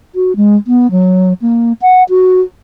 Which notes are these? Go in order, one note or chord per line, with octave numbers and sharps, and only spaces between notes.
F#4
G#3
B3
F#3
A#3
F#5
F#4